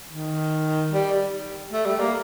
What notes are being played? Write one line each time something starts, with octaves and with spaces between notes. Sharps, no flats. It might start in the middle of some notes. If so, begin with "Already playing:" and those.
D#3
G3
A3
G3
A#3